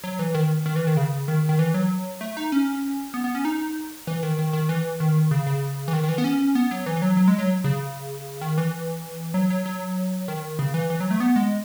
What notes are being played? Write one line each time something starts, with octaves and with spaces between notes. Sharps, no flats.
F#3
E3
D#3
D#3
E3
D#3
C#3
D#3
D#3
E3
F#3
A3
D#4
C#4
B3
B3
C#4
D#4
E3
D#3
D#3
D#3
E3
D#3
C#3
C#3
E3
D#3
D#3
E3
B3
C#4
B3
F#3
E3
E3
F#3
F#3
G#3
F#3
C#3
D#3
E3
F#3
F#3
F#3
D#3
C#3
E3
E3
F#3
A3
B3
G#3